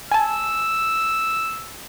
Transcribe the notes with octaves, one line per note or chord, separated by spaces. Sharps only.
G#5 A5 E6